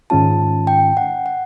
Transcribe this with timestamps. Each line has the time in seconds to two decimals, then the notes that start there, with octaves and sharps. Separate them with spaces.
0.10 G#2 D#3 G#3 C#4 F4 A5
0.67 G5
0.97 F#5
1.26 F#5